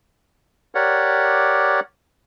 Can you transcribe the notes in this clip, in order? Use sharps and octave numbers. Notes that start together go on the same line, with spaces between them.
G4 A#4 C#5 D5 F#5